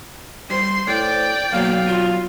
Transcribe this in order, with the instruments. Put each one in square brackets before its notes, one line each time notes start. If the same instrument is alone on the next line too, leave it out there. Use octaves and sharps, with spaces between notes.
[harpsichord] G3 [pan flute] C5 [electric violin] C6
[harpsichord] A2 [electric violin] D5 G5
[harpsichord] B1 F#3 [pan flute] A#3 [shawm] F5
[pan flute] F4